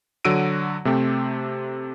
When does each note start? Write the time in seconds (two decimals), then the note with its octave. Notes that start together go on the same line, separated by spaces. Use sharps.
0.25 D3 F#3 F#4 E6 D7 D#7
0.85 C3 A3 C4 G4